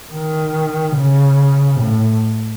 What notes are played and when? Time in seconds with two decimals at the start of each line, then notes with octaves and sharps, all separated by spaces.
0.13 D#3
0.97 C#3
1.81 A2